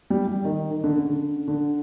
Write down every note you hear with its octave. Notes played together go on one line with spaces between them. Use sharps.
G3
G3
D#3
D#3
D3
C#3
D3
D3